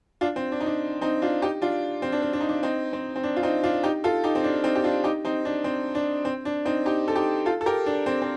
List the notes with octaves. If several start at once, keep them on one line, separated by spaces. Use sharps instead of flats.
D4 F4
C4
D4
D#4
D4
C4 D#4
D4 F4
D#4 G4
D4 F4
C4
D4
C4
D4
D#4
D4
C4 D#4
C4
C4
D4
F4
C4 D#4
D4 F4
D#4 G4
F4 A4
D#4 G4
C4
D4
C4 D#4
G4
D4 F4
D#4 G4
C4 D#4
D4
C4
D4
C4
D4
C4 D#4
D#4 G4
A4
D#4 G4
F4 A4
A4
G4 A#4
D4
C4
C4